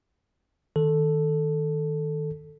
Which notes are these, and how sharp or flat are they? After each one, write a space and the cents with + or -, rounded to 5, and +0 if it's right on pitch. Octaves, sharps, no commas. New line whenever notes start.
D#3 +0 A4 +0